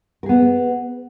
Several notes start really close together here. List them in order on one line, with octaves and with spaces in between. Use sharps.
A#4 G#4 B3